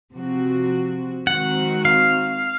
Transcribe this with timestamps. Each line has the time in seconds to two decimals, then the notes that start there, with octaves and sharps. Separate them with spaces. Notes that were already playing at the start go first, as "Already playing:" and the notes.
0.13 C3 F3 C4 F#4
1.27 D#3 G#3 C4 F#4 F#5
1.85 F5